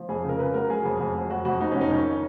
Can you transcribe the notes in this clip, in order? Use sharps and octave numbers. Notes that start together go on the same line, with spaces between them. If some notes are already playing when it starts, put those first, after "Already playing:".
Already playing: F3
F2 G#4
C#3
A#4
C#3 B4
F#3 A#4
F#3 G#4
F2
F2
F#3
F2 F#4
F2 F#4
F2 D#4
C#4
F2 D#4
D#3 C#4